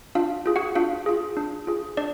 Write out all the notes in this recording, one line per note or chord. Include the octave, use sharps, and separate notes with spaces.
D4 F4 F5
F4 G#4
F#4 F#5
D4 F4 F5
F4 G#4
D4
F4 G#4
D4 D5